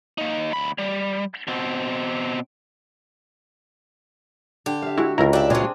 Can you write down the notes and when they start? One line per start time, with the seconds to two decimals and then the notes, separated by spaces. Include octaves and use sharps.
0.18 A#3 D#4
0.53 D2 B5
0.78 G3
1.48 B2 C4
4.66 D3 G4
4.82 E5 F5
4.97 G#3 E4 F#4
5.18 C#2 E4 A#4 A#5
5.33 D4 G4 E5 G5
5.50 A#2 F#3 C4 D4 F4 G#4